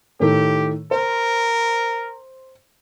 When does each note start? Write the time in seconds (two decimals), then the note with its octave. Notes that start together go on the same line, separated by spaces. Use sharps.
0.20 A2 D#3 A3 G4
0.91 A#4 C5